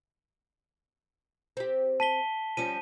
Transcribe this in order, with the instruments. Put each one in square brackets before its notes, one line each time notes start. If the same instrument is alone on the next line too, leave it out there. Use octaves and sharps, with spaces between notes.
[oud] C4 G4
[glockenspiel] A5 B6 G7
[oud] F3 G3 C#4 [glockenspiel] D#7